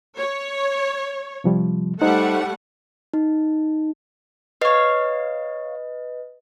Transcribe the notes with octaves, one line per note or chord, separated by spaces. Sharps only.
C#5
C3 F3 G3
G3 A3 D#4 C5 F#5
D#4
B4 C#5 D#5 F5